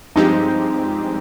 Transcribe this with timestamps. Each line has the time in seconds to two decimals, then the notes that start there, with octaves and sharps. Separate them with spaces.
0.16 G2 F3 G#3 C4 D#4 G4